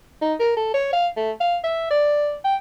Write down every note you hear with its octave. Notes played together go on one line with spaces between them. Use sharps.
D#4
A#4
A4
C#5
F5
A3
F5
E5
D5
G5